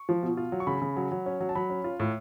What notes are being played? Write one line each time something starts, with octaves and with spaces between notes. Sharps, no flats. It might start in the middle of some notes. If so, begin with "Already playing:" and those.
Already playing: C#6
F3
B2
F4
F#3
C#6
C#3 B5
C#3
F#3
F#3
C#4
F#3
A5
F#3 B5
C#4
F4
A2